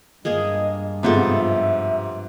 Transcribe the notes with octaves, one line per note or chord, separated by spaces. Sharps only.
G2 G#3 A#3 G#4 D#5
G#2 C3 F3 B3 A4 E5